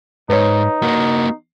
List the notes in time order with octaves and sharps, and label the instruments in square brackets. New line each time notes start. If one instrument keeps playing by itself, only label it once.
[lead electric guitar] G#2 [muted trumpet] D#4 [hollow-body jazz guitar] B4 C#5
[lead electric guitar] A#3 F#4